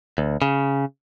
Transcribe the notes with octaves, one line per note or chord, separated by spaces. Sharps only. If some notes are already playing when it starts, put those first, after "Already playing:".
D2
C#3